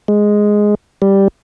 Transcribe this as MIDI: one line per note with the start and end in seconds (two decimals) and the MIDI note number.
0.08 0.75 56
1.02 1.28 55